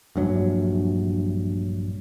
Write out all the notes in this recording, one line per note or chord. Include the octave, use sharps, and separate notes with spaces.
A#1 G2 F#3